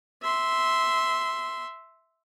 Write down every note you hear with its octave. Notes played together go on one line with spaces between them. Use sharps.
E5 C6